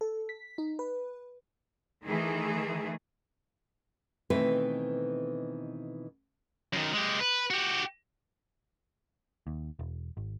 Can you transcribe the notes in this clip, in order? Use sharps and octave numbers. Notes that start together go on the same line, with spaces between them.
A4
B6
D#4
B4
D#3 E3 A3 G#4
B2 D#3 E3 A3 C4 B4
F#2 D#3
G#3 G4
B4
F#4 G4
D#2
E1
G#1